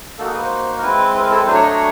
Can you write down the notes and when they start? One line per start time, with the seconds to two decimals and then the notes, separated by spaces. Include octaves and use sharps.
0.18 A#3 D#4 F#4 A4
0.27 G#4
0.34 B4
0.42 C5
0.78 A#4
0.82 G#3 C4 E4 B4
1.15 B4
1.22 A#4
1.30 A4
1.38 B4
1.46 F#3 A3 D4 C5
1.55 C#5
1.62 D#5
1.71 C#5